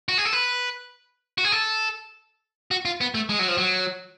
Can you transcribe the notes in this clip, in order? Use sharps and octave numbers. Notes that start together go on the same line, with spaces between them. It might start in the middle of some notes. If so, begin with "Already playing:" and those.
F#4
G#4
A4
B4
F#4
G#4
A4
F#4
F4
B3
A3
G#3
F#3
F3
F#3